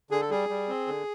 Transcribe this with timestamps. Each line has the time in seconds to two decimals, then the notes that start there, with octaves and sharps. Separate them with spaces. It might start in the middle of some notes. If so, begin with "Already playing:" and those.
0.11 D3 G#4
0.21 A4
0.30 G3 G#4
0.49 G3
0.68 C4
0.87 D3